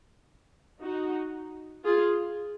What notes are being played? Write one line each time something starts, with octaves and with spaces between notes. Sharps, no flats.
D#4 F#4
F4 G#4